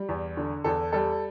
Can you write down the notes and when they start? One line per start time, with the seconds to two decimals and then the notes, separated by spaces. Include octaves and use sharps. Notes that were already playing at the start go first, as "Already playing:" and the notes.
Already playing: G3
0.09 E2
0.37 D3
0.64 E2 A4
0.93 G3 A4